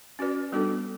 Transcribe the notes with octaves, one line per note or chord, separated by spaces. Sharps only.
C#4 F#4 B4 D5
G3 B3 D4 F#4 A4